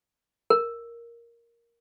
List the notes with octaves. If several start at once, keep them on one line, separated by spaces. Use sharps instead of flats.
A#4